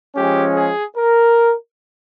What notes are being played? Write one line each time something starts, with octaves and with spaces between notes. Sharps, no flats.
F3 G#3 C#4 G4
G#4
A#4